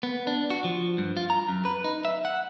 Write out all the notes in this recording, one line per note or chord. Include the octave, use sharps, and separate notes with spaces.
B3
D4
F#4
F3
G2
F4
A#5
F#2
B4
D#4
E5
F#5